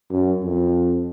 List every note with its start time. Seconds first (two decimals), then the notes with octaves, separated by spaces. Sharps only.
0.11 F#2
0.43 F2